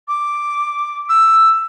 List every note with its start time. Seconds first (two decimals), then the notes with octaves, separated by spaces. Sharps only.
0.08 D6
1.09 E6